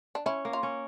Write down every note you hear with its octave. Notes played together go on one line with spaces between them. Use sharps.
D4
C#4 E4
A#3
F4
C#4